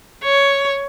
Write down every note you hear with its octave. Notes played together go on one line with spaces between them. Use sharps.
C#5